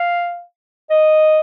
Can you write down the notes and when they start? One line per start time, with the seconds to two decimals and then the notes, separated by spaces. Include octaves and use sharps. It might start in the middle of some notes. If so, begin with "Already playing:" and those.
Already playing: F5
0.91 D#5